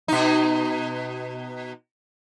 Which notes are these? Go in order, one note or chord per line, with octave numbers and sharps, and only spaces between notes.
B2 D#4